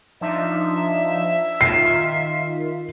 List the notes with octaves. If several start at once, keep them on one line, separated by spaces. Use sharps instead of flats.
F3 D4 D#4 E5
D#3 F4 C7